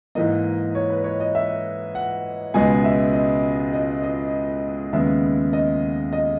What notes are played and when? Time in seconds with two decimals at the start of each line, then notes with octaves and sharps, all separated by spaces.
0.15 G#2 E3 A#3 D#5
0.75 C#5
0.90 B4
1.04 C#5
1.20 D#5
1.35 E5
1.95 F#5
2.54 C#2 B2 G#3 B3 G#5
2.84 E5
3.14 D#5
3.74 D#5
4.03 D#5
4.93 D#2 C#3 G#3 B3 E5
5.53 D#5
6.13 D#5